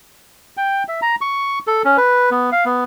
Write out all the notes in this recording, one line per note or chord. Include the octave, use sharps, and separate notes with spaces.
G5
E5
A#5
C#6
A4
C#4
B4
B3
F5
B3